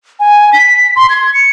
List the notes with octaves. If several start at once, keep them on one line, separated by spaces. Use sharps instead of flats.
G#5
B6
C6
G#6
C#7